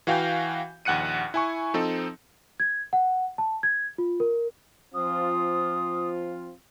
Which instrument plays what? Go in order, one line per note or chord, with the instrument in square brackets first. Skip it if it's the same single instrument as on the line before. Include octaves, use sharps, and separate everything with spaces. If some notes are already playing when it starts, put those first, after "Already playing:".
[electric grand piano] E3 F#4 F5 G5 G#5 G6
A#1 D#2 F#5 F#6 C#7 D#7
E4 G#5 C#6
F3 C4 D#4 A4
[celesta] G#6
F#5
A5
G#6
F4
A#4
[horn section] F3 C4 F4 [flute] D#6